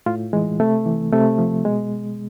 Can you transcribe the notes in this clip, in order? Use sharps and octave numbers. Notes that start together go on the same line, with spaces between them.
A2 F4
E3 G#3
C3 A3
E3
C3 A3
F3
B2 G#3